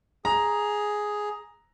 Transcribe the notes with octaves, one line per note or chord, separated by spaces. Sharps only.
G#4 A#5